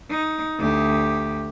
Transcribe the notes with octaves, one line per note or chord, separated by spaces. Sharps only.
D#4
D2 G4